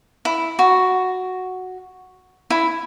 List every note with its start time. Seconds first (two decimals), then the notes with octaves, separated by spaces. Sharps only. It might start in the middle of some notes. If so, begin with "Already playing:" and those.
0.25 E4
0.59 F#4
2.50 E4